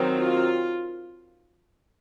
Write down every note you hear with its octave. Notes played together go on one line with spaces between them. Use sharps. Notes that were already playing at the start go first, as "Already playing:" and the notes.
Already playing: D#3 F#3 C4
F4